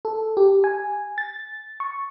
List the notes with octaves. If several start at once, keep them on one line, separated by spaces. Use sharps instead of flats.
A4
G4
G#5
A6
C#6